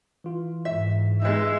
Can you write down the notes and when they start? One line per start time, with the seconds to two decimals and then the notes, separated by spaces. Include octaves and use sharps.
0.24 E3 F4
0.65 G#2 E5
1.22 G#3 D#4 B4 E5